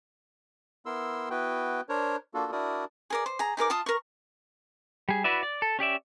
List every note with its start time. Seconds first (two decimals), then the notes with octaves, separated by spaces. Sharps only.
0.86 B3 E4 A#4 C6 E6
1.30 B3 E4 F#4 B4 G5
1.89 D4 A#4 C5 C#5
2.34 A#3 D4 F4 F#4 A4
2.52 D4 E4 F#4 A#4 D5 D#6
3.10 G#4 A#4 D5
3.26 C5
3.39 G#4 A#5
3.57 D#4 G#4 A#4 D6
3.70 F4 F5 A5 D#6
3.86 A#4 C#6
5.09 G3 G#4
5.24 E4 F#4 B4 D5 E5
5.43 D5
5.62 A4
5.79 C#4 G4 D5 E5